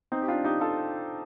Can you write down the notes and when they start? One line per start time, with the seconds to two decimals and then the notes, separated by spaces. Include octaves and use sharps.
0.12 C4 D#4
0.22 G4
0.28 D4 F4
0.45 D#4 G4
0.60 F4 A4